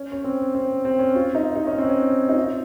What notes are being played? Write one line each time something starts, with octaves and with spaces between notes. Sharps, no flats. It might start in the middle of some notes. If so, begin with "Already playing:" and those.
Already playing: C#4
C#4
C4
C4
C4
C#4
F4
D#4
D#4
C#4
C4
C#4
D#4
F4